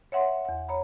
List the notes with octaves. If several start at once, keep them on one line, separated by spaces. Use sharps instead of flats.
C#5 E5 F#5 C6
E2 F#5
C#5 A#5 B5